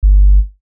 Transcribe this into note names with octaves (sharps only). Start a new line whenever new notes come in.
G1